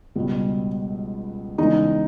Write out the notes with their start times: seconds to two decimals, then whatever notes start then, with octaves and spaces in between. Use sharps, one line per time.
0.15 C#2 B2 G3
1.58 E2 C#3 G#3 D#4